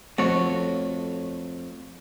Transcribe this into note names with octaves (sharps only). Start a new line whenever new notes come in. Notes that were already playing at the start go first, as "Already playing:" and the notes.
F2 A3 F#4 C#5